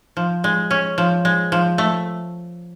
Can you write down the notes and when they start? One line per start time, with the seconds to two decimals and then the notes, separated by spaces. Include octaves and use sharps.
0.17 F3
0.44 G#3
0.71 C#4
0.98 F3
1.25 G#3
1.52 F3
1.78 A3